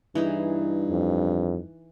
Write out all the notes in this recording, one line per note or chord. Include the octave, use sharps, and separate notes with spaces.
G2 E3 D#4 G#4
F2